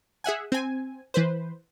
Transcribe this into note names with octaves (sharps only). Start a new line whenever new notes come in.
G#4 E5 F#5 G#5
C4 G#5
E3 B4 C5